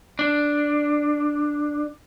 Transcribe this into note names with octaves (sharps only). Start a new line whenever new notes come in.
D4